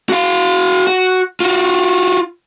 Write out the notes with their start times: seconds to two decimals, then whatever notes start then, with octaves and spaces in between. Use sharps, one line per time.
0.09 F#4 F5
0.87 F#4
1.40 F4 F#4